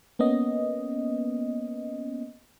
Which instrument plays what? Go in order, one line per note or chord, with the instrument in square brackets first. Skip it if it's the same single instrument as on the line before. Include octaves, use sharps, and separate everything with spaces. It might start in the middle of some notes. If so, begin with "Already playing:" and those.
[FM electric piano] A#3 B3 C#4 D#5